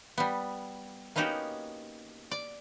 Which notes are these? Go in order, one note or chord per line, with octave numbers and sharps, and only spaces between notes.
G3 B3
A#3 B3 C#4 D#4 F#4 G4
D5